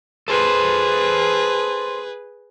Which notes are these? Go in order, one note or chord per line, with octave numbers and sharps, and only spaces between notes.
G#4 A4 B4 C5